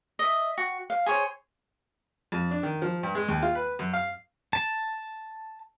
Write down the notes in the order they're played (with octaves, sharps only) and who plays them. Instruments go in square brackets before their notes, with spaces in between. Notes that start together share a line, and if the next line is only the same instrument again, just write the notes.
[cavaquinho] D#5 E5
F#4
F5
G#4 C5 C#5
[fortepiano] F2
D4
D#3
F3
G2
G#3
D#2
F4
B4
F#2
F5
[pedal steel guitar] A5